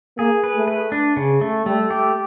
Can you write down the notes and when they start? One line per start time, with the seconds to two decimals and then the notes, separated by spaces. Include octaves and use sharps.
0.19 A#3 G#4
0.44 B4
0.55 A3
0.68 B4
0.92 D4
1.17 C#3
1.41 A3
1.66 G3 A3
1.91 G4